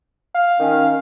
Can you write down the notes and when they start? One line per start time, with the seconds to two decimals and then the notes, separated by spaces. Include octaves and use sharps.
0.34 F5
0.58 D#3 C#4